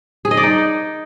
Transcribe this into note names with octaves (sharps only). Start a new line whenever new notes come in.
G#4
D#5
D5
D#4